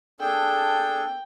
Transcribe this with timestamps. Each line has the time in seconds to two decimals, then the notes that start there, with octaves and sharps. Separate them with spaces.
0.20 D4 G#4 A4 G5